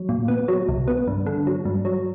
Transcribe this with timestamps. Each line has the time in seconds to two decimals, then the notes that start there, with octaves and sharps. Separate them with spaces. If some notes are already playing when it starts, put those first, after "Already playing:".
Already playing: F#3
0.09 A#2
0.28 B3
0.48 F#3
0.69 C2
0.88 B3
1.07 G2
1.26 D3
1.47 F#3
1.65 G2
1.85 F#3